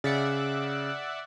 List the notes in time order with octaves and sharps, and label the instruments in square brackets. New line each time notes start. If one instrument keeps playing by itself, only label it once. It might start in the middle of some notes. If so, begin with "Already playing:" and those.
[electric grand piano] C#3 [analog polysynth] D5 E5 F#5